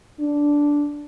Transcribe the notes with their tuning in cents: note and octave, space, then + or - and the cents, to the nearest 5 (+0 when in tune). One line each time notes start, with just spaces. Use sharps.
D4 -10